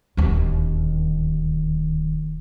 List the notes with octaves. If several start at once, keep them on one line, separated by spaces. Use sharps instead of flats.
D1 D#2